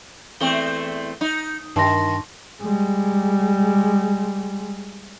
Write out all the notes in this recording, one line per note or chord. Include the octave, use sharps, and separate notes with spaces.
E2 A3 C4 G7
D#4
G2 D#3 A5 C6 A#6
G3 G#3